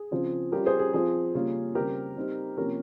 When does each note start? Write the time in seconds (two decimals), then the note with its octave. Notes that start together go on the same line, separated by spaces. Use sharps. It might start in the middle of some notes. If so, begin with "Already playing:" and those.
Already playing: G#4
0.11 C#3 F3 C4 F4
0.52 G3 C#4 F4 G4 A#4
0.66 G#4 C5
0.79 G#4
0.93 F3 C4 F4 G#4
1.35 C#3 G3 A#3 C#4 F4
1.75 C#3 G3 C4 G4 A#4
2.16 G3 C4 D#4
2.57 C3 F3 A#3 C#4 G4 A#4